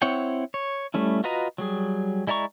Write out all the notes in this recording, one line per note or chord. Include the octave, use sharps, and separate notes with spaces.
C4 E4 C#5 F#5 G5
C#5
G3 A3 C#4 E4
F4 F#4 B4 D#5 A#5
F#3 G3 G#4
G#3 E4 D5 A#5 C#6